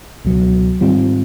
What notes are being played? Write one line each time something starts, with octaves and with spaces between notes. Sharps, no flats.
C#2 B2 F#3
G#2 D#3 G3 C4 F4